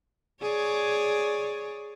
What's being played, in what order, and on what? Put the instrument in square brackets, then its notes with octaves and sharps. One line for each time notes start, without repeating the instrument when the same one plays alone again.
[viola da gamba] G#4 C#5 D5